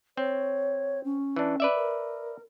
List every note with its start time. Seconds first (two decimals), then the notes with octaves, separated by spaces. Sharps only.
0.17 C4 C#5
1.04 C#4
1.36 E3 D4
1.60 B4 D5 E5
1.75 A#4